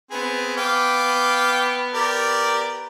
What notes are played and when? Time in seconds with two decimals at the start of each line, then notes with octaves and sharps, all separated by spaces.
0.11 B3 C4 G#4
0.57 F5 G5 D6
1.94 G4 A#4 D5